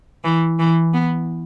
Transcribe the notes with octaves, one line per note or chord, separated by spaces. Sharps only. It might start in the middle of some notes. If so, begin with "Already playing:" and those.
E3
E3
B3